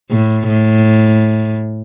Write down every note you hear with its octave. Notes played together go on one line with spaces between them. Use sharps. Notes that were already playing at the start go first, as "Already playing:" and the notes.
A2
A2